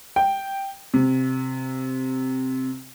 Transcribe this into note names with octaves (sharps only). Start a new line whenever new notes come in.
G5
C3